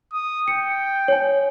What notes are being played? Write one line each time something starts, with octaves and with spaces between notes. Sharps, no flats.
D#6
G5 C#7
C#5 G#5